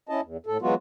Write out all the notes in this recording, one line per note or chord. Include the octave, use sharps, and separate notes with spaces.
C#4 E4 D#5 A5
E2
A2 A4
E3 F#3 G#3 B3 F4 F#4